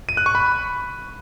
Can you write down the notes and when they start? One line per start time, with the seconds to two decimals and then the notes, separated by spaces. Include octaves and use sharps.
0.09 D#7
0.17 F#6
0.26 C#6
0.35 B5